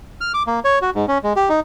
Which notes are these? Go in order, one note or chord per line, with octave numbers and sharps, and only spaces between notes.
F6
D6
A#3
C#5
F#4
G#2
C#4
G#3
G4
D#4